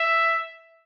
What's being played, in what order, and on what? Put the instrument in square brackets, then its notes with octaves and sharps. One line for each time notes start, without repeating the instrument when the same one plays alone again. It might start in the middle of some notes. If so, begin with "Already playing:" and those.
Already playing: [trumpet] E5